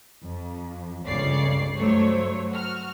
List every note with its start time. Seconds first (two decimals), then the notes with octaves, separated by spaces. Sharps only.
0.24 F2
1.06 G1 C#2 C#3 C#5 D5 C7
1.76 G2 F#3 A3 C5 C#5
2.50 F#4 F6